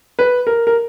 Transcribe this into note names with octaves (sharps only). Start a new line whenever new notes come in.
B4
A#4
A#4